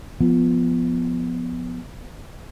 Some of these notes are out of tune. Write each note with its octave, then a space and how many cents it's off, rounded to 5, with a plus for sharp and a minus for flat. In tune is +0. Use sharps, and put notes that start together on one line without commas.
F3 +0 B3 +0